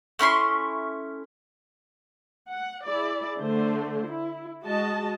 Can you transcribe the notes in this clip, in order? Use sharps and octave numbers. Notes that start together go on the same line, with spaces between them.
A3 C#4 E4 C6
F#5
E4 G#4 D5
D3 A3 C5
E4
G#3 F#4 D#5 A5